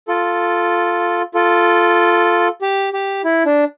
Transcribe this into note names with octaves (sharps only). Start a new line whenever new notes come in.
F4 A4
F4 A4
G4
G4
E4
D4